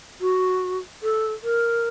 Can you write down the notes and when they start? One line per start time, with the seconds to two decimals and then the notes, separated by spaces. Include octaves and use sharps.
0.21 F#4
1.03 A4
1.43 A#4